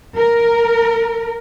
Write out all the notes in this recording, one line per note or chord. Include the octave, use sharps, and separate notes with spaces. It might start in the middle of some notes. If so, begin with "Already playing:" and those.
A#4